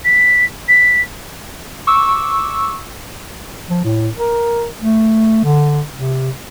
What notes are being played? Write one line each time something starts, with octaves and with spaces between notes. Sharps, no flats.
B6
B6
C#6 D6 E6
F3
A2
A#4
A3
D3
C3